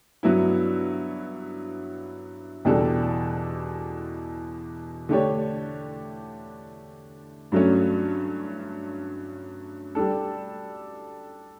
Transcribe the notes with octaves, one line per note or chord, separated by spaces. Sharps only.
G2 F#3 B3 E4
E2 B2 G3 D4 A4
D3 A3 D4 G4 C#5
G2 F#3 A3 C#4
G3 D4 A4